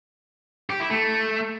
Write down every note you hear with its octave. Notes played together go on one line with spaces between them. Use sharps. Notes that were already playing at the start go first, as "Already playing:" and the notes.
G4
E4
A3